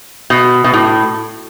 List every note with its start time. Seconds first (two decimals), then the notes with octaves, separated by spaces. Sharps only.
0.30 B2
0.64 B2
0.73 A2